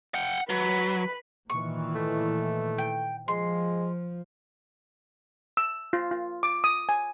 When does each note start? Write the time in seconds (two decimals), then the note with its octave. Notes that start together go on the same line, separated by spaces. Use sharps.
0.14 F#5 G5
0.50 F#3 B4 B5
1.50 A#2 D#3 E3 C#6
1.95 A3
2.78 G5
3.28 F3 G#3 C6
5.57 E6
5.93 F4
6.11 F4
6.43 D6
6.64 D#6
6.89 G#5